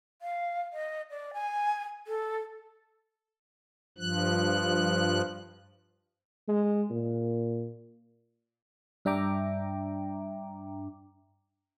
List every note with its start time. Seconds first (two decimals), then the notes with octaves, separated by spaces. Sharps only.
0.22 F5
0.73 D#5
1.10 D5
1.34 G#5
2.07 A4
3.98 G2 F3 F#6
6.48 G#3
6.91 A#2
9.05 G2 D4 E5 G5 A#5 D6